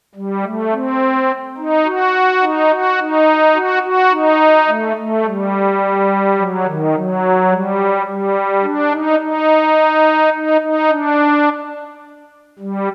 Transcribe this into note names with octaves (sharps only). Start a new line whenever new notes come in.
G3
A3
C4
D#4
F#4
D#4
F#4
D#4
F#4
F#4
D#4
A3
A3
G3
F#3
D#3
F#3
G3
G3
D4
D#4
D#4
D#4
D#4
D4
G3